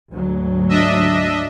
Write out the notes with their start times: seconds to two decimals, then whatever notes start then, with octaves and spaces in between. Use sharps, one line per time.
0.12 D2 G#2 F#3
0.69 D4 D#5 E5